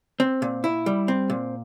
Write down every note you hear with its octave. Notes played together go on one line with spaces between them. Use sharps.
C4
A#2
E4
G3
C4
A#2